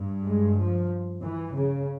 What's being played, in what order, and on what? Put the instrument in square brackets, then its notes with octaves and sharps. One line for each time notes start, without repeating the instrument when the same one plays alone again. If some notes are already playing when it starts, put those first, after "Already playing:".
Already playing: [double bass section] G2
G#3
F3
E3
C#3